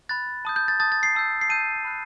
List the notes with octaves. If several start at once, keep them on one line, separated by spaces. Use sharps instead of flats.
B5 F#6 A6
A5 D#6 G6
G6
A6
A5 D#6 G6 A6
A6
C7
A5 E6 G6
C7
A5 E6 G6 D#7
B5 F#6